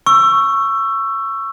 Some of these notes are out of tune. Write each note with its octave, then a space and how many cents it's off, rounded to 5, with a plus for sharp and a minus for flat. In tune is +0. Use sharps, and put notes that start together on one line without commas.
C#6 +0 E6 +20